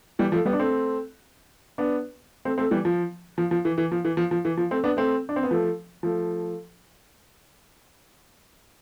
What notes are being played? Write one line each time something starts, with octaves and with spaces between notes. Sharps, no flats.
E3 G3
F3 A3
G3 B3
D4
A3 C4
B3 D4
A3 C4
A3 C4
E3 G3
F3
F3
F3
E3
E3
F3
E3
F3
F3
E3
F3
A3 C4
B3 D4
A3 C4
D4
C4
B3
F3 A3
F3 A3